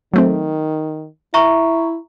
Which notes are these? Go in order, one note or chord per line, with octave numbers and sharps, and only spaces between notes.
D#3 F#3 A3 C4
E4 E5 A#5 C#6